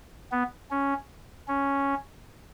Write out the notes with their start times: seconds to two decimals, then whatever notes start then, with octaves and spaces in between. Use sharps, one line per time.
0.32 B3
0.71 C#4
1.48 C#4